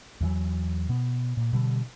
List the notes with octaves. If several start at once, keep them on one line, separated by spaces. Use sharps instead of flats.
E2 E3 F#3
B2 B3
A#2
B2 D3 G3